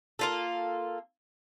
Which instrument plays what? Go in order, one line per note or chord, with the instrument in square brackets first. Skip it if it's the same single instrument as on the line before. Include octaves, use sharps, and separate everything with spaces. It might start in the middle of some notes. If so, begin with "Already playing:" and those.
[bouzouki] A#3 F4 A4